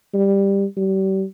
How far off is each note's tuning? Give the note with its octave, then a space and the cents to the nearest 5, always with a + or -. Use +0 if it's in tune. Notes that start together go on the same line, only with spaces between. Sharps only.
G3 +10
G3 -35